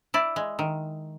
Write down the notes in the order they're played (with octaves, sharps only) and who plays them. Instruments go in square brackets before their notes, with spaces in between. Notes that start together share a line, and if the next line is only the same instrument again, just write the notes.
[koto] E4 D5
G#3
D#3